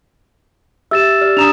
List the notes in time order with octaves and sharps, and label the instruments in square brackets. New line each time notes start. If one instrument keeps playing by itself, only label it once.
[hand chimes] G4 E5 [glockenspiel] E6 A6 E7
[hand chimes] G4 D5 F6
[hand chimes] D4 D5 A#5 [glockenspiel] D#6 E7 F7